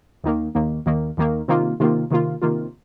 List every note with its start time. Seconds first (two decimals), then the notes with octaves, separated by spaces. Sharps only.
0.23 D#2 D#3 A#3
0.55 D#2 D#3 A#3
0.86 D#2 D#3 A#3
1.17 D#2 D#3 A#3
1.48 C3 D#3 A#3 F4
1.80 C3 D#3 A#3 F4
2.11 C3 D#3 A#3 F4
2.42 C3 D#3 A#3 F4